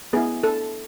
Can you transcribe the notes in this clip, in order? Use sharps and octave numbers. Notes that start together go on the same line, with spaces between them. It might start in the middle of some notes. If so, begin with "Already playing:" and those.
B3 E4 G#4
A4